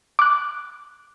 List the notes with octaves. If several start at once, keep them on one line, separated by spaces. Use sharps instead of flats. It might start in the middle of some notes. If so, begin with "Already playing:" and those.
D6 F#6